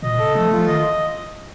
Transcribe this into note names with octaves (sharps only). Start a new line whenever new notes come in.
A#2 D#5
C#3 A4
F3 A3
F3 F4
D#3 D#5